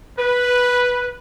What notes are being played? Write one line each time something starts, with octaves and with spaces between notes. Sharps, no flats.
B4